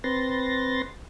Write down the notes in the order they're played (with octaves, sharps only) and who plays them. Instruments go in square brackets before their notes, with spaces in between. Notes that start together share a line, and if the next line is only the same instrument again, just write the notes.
[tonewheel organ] C4 B4 C6 A6 A#6